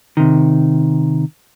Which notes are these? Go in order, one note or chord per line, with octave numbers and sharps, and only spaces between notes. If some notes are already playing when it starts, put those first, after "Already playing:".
C3 D#3